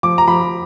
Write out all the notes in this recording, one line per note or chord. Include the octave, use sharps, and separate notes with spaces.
F3 D6
A#5
F3 B5